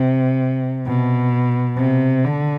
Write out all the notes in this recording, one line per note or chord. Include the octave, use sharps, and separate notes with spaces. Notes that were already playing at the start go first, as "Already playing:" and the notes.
Already playing: C3
B2
C3
D3